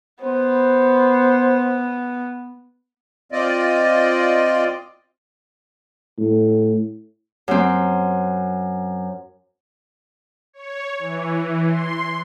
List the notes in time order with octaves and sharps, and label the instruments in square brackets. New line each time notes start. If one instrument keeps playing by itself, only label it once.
[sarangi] B3 [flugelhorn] C5
[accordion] C4 F4 D5 D#5
[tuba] A2
[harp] F#2 C4
[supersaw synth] C#5
E3
C6